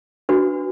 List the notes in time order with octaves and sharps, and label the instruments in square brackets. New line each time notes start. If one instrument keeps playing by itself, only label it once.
[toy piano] D4 F#4 B4